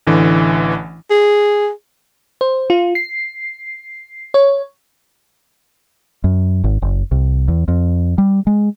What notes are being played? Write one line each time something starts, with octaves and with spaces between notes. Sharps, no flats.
A1 D3 E3
G#4
C5
F4
C7
C#5
F#2
G#1
F#1
C2
E2
F2
G3
G#3